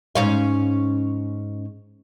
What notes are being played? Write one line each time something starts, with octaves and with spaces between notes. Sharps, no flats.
G#2 C#4 F5